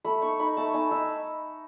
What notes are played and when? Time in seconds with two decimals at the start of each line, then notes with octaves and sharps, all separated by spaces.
0.04 A3 B5
0.21 D#4 C#6
0.39 D#4 B5
0.57 A3 A5
0.73 D#4 G#5
0.91 D#4 E5